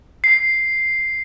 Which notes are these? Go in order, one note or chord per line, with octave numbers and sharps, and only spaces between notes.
C7